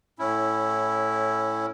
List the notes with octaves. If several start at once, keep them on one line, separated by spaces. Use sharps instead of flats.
A2 C#4 E4